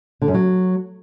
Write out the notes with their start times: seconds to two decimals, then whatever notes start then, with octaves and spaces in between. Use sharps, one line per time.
0.22 D3
0.28 F#2
0.34 F#3